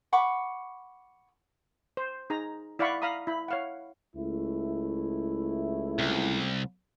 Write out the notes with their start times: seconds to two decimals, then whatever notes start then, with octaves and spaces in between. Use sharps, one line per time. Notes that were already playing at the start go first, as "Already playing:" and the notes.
0.13 F#5 B5 C#6 D6
1.97 C5
2.30 D#4 G#4 A#5
2.79 E4 D5 F5 F#5 B5 C#6
3.02 F5 A#5 B5 D#6
3.27 E4 B5
3.48 C#5 F5 F#5
4.15 C#2 A3 E4
5.99 C2